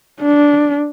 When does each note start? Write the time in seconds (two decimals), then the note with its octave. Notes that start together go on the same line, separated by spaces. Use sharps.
0.21 D4